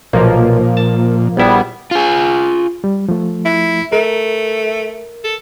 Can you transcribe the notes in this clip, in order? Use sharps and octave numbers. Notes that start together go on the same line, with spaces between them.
B1 A#2 F3 A#3
A5
A#1 G3 B3 E4
F4 G#4
G3
F3 A3
E4
A3 A#4
A4